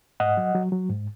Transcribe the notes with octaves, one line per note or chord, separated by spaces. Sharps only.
G#2 D#5 F#5
F#3
F#3
F#3
G#2